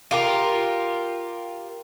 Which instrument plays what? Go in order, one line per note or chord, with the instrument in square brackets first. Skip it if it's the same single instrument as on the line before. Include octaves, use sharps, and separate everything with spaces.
[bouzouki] F4 G4 A#4